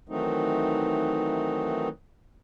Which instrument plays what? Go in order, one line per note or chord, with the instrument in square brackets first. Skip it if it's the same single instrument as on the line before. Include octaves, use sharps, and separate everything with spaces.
[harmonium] D#3 E3 F#3 A3 C4 D#4